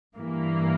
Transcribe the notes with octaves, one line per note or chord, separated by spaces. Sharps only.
G2 E3 A#3